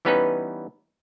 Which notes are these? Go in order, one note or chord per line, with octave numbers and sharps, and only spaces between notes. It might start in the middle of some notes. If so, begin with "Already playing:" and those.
E3 G3 B3 C#4 D#4 B4